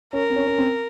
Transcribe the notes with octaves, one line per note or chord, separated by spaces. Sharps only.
C#4 A#4
C4
C#4
C#4
C4